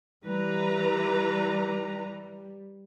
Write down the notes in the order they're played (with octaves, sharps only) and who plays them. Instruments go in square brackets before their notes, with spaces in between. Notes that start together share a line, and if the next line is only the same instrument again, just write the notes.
[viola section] E3 B4 A#5 [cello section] G3